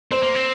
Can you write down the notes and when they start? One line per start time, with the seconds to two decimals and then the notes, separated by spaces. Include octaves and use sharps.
0.11 C4 C5
0.23 A#3
0.35 C4